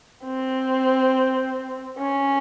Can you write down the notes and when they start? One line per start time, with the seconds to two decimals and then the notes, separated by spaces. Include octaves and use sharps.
0.24 C4
1.98 C#4